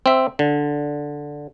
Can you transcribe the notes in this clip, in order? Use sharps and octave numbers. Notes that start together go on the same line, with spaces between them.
C4 E5
D3